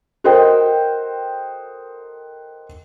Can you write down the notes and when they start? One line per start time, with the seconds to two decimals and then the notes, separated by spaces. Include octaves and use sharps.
0.24 F#4 A4 A#4 C5 D#5 G5